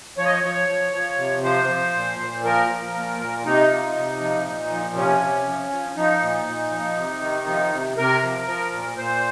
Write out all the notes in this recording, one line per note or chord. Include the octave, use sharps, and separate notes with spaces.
F3 C#5
D#5
C#5
F3 C#5
F3
F3
C3
F3 C5
F3
A#2
A#2
F3 A#4
F3
A#2
A#2
C3 D#4
F3
C3
F3
A#2
F3
C3 C#4
C3
F3
F3
F3 D#4
A#2
A#2
F3
C3
D#3
F3
C3
C3 A#4
F3
F3
A#2
A#2 C5